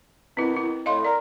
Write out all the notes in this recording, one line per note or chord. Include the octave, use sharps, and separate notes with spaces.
B2 D#3 C4 E4
E4
A2 D#5 F5 C6
A#4 D5